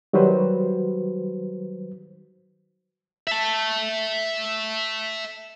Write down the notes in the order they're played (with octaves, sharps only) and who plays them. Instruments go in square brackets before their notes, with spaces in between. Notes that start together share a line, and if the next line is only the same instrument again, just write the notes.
[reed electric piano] D#3 F#3 G3 F#4 B4 C5
[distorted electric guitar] E5 A5